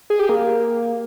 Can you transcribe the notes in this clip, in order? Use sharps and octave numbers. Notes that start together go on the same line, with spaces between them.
G#4
G4
A#3